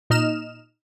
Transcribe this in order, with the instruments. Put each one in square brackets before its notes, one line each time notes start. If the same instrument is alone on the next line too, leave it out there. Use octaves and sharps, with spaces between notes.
[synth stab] A#2 D#4 D#5 F6 E7